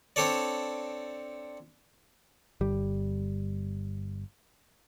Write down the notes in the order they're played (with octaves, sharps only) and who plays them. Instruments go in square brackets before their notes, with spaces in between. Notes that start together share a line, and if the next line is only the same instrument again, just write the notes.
[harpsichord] C4 D4 A4 C#5 D5
[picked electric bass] G1 G3